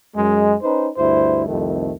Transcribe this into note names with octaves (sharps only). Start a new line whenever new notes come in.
F#2 G#3
C#4 D#4 B4 C5
D2 G2 E4 C5
C2 F2 D#3 A3